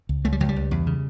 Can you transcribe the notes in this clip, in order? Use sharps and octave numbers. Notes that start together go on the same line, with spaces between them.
C#2
C#2 A3
G3
C#2 F#3
G3
C#2
E2
C#3